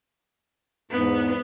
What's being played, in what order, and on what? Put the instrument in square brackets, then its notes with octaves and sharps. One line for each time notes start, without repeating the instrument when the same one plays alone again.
[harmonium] E2 G#2 [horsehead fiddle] B3